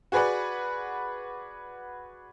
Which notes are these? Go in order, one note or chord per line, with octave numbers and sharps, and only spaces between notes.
F#4 G#4 B4 D5 F#5